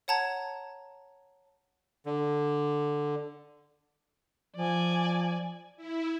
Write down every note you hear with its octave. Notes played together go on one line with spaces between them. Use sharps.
C#5 F#5 A5 A#5 G#6
D3
F3 D5 G#5
E4